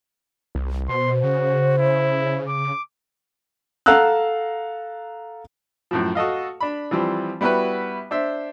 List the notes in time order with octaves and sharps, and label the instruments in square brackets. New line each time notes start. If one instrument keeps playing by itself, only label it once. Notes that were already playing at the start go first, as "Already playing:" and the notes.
[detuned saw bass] C2
[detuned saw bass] B2 [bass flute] C5 [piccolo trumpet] C6
[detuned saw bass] C#3 [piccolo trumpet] F#4
[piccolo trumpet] E4
D6
[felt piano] A4 F5 F#5 A#5 E6 F#6
[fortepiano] F#2 A2 F3
F#4 A4 D#5 F5
D4 B5
E3 F3 G3 C4
G3 B3 E4 F#4 B4
D4 C5 E5